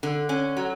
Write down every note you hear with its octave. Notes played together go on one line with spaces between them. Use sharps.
D3
C#4
F#3